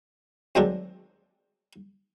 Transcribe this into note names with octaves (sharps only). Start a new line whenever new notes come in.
D2 D#3 F#3 G#3 C4 D4